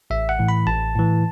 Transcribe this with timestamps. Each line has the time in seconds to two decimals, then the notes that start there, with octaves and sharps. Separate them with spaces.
0.10 A1 E5
0.29 F#5
0.39 A2 E3
0.49 B5
0.67 A1 A5
0.95 A2 E3